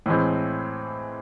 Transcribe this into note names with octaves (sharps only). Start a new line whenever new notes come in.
A2 E3 G#3 C4